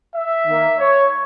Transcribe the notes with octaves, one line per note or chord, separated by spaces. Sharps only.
E5
D#3 A#3
C#5